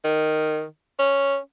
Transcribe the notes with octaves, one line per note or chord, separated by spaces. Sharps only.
D#3
C#4